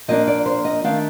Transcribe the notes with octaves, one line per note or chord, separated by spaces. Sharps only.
F3 A#3 D4 D#5
D5
C5
D#5
D#3 A3 D4 F5